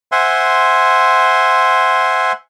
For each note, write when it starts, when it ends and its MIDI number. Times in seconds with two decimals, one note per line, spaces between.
0.12 2.32 72
0.12 2.32 76
0.12 2.32 78
0.12 2.32 80
0.12 2.32 84